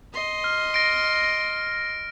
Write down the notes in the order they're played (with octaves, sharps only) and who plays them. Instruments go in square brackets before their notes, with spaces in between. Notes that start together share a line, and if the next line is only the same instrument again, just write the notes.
[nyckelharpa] D#5 C6
[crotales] F6
A#6 D7